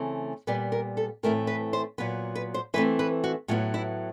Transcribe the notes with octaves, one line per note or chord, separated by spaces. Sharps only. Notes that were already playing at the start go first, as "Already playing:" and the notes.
Already playing: C#3 E3 A3 C4
A#2 G3 B3 B4
A#4
A4
A2 E3 A3 C4 A#4
B4
C5
A#2 F#3 B3 B4
B4
C5
E3 A3 C4 B4
B4
F#4
A2 F#3 B3 F4
E4